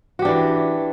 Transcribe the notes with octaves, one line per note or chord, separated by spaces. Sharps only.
E3 D4 F#4 G4